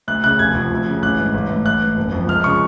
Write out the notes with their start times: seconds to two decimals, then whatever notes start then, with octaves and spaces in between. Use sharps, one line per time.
0.08 D2 F#6
0.24 C#3 F#6
0.39 F1 G#6
0.55 F2
0.71 D2
0.86 C#3
1.02 A1 F#6
1.19 G#2
1.34 A1
1.50 A2
1.65 A1 F#6
1.81 G#2
1.96 F#1
2.12 F2
2.28 C#2 F6
2.44 C#3 C#6